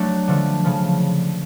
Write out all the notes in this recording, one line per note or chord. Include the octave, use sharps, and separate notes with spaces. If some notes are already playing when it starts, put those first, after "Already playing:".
Already playing: F#3 A3 D4
D3 F3 A3
C#3 F3